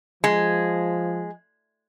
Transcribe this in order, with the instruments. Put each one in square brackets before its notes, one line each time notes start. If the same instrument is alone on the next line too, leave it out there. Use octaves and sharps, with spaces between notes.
[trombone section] F3 [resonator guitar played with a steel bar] G#3